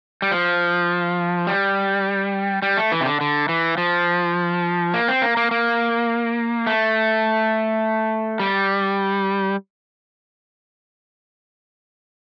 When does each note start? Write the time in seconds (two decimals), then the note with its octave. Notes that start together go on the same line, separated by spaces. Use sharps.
0.22 G3
0.32 F3
1.47 G3
2.62 G3
2.77 A3
2.92 E3
3.01 C3
3.06 D3
3.21 D3
3.49 E3
3.78 F3
4.94 A#3
5.08 C4
5.22 A#3
5.37 A#3
5.51 A#3
6.67 A3
8.40 G3